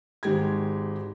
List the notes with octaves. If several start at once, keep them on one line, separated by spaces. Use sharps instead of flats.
G#1 D#3 G#3 G4 G#6